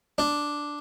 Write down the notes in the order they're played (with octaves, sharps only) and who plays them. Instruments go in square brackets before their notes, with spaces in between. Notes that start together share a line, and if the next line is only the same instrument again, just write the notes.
[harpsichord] D4